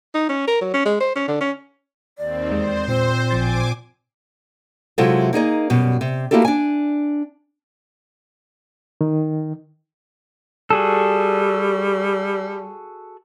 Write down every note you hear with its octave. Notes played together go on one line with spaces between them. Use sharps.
D#4
C#4
A#4
F#3
C#4
G#3
C5
C#4
D3
C#4
D#2 C4 D5
E2 G#3 C5
A#2 C4
A1 F3 G#5 D6 A6
C3 F#3 G#3 E4 F4 A4
A#3 D#4 G#4 D#5
F#2 B2 G3
C3
A3 A#3 E4 F#4 G4 A4
D4 G#5
D#3
G3 F#4 G#4 A4